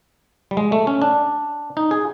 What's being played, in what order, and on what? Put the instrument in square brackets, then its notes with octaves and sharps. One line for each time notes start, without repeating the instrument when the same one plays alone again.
[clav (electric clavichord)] G3
G#3
A3
C#4
D4
D#4
G#4